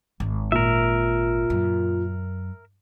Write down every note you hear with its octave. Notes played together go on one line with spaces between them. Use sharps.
G#1
A#2 A#4 E5
F#2